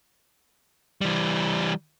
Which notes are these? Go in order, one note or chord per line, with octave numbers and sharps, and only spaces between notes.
E3 G3